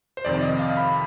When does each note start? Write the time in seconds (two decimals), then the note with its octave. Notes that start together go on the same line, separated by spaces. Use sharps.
0.17 C5
0.25 F2 C3 D#3 D5
0.42 D#5
0.59 F5
0.77 B5